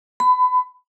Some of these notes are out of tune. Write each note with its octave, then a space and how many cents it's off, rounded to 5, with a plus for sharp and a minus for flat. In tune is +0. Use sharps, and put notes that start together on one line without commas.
B5 +30